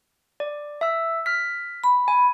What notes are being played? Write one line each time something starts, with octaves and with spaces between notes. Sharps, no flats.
D5
E5 E6
F6 B6
B5
G#5